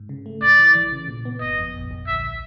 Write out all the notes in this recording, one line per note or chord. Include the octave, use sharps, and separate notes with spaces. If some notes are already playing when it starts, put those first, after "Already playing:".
Already playing: G#2
C#3
A3
A1 D5
E3
E3
C#3
A#2
B3
G1 D#5
F2
A#1
A#1
D2 E5